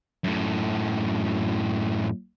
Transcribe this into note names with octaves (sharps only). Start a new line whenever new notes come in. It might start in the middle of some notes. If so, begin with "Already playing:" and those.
F#2 A2